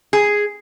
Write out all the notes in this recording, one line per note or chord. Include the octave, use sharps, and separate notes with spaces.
G#4